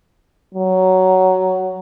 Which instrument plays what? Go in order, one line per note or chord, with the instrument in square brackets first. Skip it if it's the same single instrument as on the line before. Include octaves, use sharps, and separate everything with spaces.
[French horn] F#3